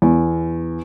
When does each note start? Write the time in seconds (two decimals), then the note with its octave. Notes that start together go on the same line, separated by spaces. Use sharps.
0.02 E2